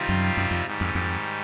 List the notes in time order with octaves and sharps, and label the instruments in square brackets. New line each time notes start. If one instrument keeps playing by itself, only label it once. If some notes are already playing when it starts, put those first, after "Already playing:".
Already playing: [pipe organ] C3 D#3 G3 C4 F4
[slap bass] F#2
F#2
F2
[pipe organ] G#2 D#3 G3
[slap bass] F2
F2